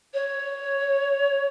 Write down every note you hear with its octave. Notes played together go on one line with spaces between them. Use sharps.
C#5